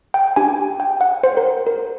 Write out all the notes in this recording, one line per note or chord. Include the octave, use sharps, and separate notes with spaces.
G5
D4 G4 G#5
G5
F#5
C5
A#4
A#4